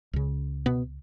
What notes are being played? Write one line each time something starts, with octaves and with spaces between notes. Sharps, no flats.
C#2 C#3
B2 B3